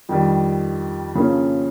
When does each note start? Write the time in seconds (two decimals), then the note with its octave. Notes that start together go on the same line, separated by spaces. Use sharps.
0.09 F2 D#3 G3
1.15 C#3 F3 A#3 C#4